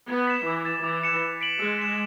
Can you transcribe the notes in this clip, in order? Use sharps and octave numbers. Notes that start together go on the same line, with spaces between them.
B3 G#6
B6 E7
E3 D6
A6 E7
E3 D6
F#6 C#7 E7
F#6
B6 D7 F#7
G#3 E6
B6 E7